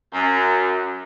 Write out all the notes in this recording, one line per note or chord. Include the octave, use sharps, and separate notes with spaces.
F#2